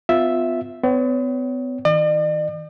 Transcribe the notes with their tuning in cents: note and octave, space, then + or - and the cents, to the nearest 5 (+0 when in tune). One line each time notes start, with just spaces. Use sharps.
B3 +40 F4 +10 E5 +0
B3 +45 C#5 +30
D#3 +45 D5 +45